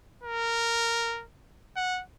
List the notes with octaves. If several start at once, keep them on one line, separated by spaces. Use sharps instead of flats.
A#4
F#5